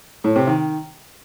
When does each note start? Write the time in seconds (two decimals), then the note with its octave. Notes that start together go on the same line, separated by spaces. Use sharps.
0.24 A2
0.36 C3
0.47 D#3